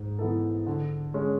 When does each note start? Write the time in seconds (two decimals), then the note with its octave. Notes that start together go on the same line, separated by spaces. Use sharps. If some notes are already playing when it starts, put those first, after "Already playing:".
Already playing: G#2
0.19 E3 B3 E4 A4
0.66 D3
1.14 G#3 C#4